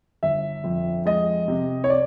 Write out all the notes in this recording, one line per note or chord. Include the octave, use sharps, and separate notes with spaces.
G1 E5
F2
G#3 D#5
C3
C#5
D5